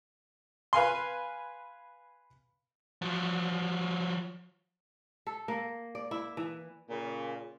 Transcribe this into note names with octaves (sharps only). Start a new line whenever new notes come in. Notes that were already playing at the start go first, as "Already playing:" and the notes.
B4 F5 G#5 C6
F3 F#3
A4
A#3
D5
E4
E3
A#2 C#3